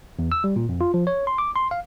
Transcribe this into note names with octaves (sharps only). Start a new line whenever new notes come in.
E2
E6
G3
A#2
F2
F4
F3
C#5
C6
D6
C6
F5